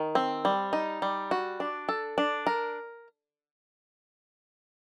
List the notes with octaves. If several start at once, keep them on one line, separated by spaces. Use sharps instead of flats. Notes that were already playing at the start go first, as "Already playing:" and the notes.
Already playing: D#3
C4
G3
D#4
G3
F#4
D4
A4
D4
A#4